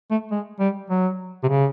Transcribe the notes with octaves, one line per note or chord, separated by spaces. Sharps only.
A3
G#3
G3
F#3
C3
C#3